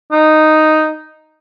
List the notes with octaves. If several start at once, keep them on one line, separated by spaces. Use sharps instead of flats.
D#4